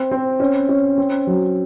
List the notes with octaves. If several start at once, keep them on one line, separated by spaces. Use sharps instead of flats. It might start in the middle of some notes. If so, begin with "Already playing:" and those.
Already playing: C4
C4
C#4
C#4
C4
F#3